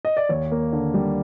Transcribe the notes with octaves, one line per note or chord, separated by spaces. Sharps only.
D#5
D5
D#2 C#5
A#3
D3
G3